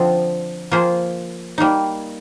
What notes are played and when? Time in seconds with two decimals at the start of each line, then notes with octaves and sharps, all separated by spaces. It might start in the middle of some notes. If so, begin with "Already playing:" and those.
Already playing: D3 F3 C4 F4
0.71 F3 A#3 F4 G#4 C5
1.58 G3 A#3 D#4